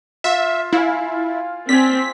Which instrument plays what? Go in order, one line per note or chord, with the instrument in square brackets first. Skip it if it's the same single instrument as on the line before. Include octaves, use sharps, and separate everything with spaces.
[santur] F4 [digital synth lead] E5
[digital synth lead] E4 [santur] F4 F5 G#5
[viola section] C4 [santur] D5 G#5 [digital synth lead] B6